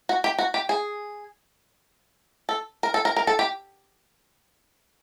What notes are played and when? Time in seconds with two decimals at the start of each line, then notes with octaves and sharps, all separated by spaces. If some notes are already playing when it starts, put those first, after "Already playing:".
0.09 F#4
0.24 G4
0.38 F#4
0.54 G4
0.69 G#4
2.49 A4
2.83 A#4
2.94 A4
3.05 A#4
3.16 A#4
3.27 A4
3.39 G4